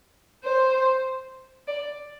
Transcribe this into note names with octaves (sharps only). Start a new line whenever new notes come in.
C5
D5